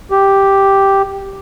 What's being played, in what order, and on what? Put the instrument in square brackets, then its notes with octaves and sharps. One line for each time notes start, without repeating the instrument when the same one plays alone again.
[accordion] G4